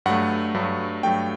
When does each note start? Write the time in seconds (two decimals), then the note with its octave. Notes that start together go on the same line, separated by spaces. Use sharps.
0.06 G2 F#3 A3 F#5
0.54 G2 F#3 A3
1.03 G2 F#3 A3 G5